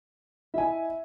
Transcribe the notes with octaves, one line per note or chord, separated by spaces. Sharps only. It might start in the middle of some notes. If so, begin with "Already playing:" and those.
E4 D#5 E5 G#5